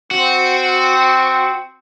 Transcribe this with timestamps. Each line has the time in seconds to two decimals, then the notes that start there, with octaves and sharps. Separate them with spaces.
0.11 C4 F#4